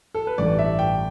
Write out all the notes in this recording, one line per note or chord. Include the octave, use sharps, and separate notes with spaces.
A4
B4
A1 G2 E3 A3 D5
E5
G5